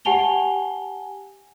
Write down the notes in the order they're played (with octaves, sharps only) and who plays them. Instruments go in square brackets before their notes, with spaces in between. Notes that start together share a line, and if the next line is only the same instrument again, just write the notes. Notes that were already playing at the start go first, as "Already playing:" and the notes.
[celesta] G4 F#5 G#5 A5 F7 G7